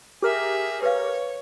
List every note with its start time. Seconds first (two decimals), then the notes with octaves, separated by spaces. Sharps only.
0.22 G4 G#4 A#4 E5
0.82 B4 C#5 F5